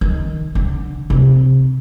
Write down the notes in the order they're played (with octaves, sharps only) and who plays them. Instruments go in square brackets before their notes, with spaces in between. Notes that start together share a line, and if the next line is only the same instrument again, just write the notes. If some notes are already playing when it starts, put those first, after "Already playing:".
[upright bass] D#3
D3
C3